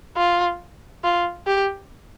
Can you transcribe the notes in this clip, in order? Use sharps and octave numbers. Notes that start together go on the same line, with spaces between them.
F4
F4
G4